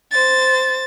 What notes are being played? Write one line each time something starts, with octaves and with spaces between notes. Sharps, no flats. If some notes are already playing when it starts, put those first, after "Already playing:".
C5 A6